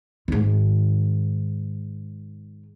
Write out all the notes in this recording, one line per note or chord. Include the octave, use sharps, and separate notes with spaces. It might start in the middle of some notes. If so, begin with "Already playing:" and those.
G#2 D#3